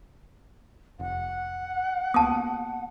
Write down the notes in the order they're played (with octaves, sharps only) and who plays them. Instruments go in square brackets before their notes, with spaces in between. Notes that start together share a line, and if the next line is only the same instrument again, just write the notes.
[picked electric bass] F1 [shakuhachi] F#5
[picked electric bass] C#2 A#3 B3 [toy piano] A5 D#6